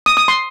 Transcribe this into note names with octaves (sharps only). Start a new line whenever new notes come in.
D#6
D#6
C6